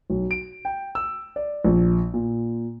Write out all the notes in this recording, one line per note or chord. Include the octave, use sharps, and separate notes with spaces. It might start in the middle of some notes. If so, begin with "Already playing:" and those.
B1
D7
G5
E6
D5
A#1
A#2